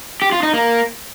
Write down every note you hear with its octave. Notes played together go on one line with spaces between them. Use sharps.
G4
F4
D#4
A#3